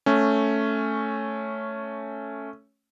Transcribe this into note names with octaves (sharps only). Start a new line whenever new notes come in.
A3 C#4